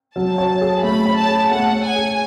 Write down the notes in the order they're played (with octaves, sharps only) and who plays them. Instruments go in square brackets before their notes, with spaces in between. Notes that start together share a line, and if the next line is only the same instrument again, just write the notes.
[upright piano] F#3 [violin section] A5
[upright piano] C#5
G#4
[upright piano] A3 [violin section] B5
[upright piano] C#5
[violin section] A5
[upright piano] G#4
[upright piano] A3 [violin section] F#5
[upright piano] C#5
[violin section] G#5
[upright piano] G#4